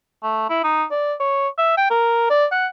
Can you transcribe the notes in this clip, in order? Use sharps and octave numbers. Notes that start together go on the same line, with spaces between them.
A3
E4
D#4
D5
C#5
E5
G5
A#4
D5
F#5